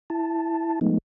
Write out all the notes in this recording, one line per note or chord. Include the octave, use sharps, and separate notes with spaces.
E4 A5
F3 G#3 A3 B3 D#4